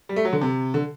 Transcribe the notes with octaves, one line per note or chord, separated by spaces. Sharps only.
G3
A3
F#3
D3
C3
D3